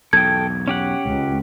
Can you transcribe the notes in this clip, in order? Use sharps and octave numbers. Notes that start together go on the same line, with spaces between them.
B1 E2 A4 G5 G#6
C#4 G4 F#5
C#2